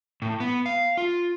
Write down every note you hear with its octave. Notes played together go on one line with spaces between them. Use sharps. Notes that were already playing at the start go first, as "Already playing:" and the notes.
A2
B3
F5
F4